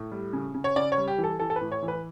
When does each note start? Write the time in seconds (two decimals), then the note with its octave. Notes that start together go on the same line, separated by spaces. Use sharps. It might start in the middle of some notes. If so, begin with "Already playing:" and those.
Already playing: A2
0.12 G3
0.33 C#3
0.54 C#3
0.64 C#5
0.76 C#3 D5
0.92 C#5
0.98 G3
1.08 G4
1.18 E3
1.24 A4
1.39 E3 A4
1.50 A4
1.56 B4
1.61 A2
1.72 C#5
1.82 E3
1.88 B4